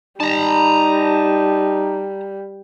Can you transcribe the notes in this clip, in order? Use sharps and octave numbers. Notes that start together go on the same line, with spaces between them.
G3 D#4 A5 A#5